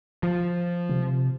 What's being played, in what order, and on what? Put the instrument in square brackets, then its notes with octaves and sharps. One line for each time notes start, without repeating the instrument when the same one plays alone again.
[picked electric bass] F3
[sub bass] C3